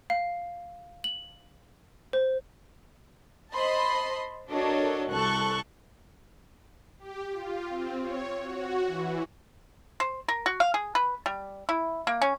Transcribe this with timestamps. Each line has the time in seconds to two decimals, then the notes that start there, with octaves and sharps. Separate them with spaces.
0.10 F5
1.04 F#7
2.13 C5
3.53 C5 D#5 A5 B5 C6
4.50 D4 F#4 A4 A#4 C#5 D#5
5.11 C2 A4 C#6 F#6
6.99 G4
7.32 F4
7.69 C4
8.02 C#5
8.42 F#4
8.86 E3
10.00 C5
10.28 A#4
10.46 F#4
10.60 F5
10.74 G#4
10.95 B4
11.26 G3
11.69 E4
12.07 A#3
12.22 C#4